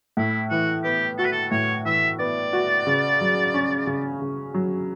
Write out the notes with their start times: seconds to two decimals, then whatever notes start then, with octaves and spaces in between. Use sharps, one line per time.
0.17 A2 E4
0.50 E3 F#4
0.84 B3 G4
1.18 F#4 A4
1.25 B4
1.32 A4
1.51 A2 C#5
1.85 E3 E5
2.19 B3 D5
2.53 F#4
2.87 C#3
3.21 F#3
3.54 C#4
3.87 C#3
4.22 C#3
4.54 F#3